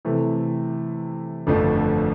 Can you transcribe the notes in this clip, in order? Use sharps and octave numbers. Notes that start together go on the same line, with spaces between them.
C3 E3 A3
G1 F2 D3 F3 A3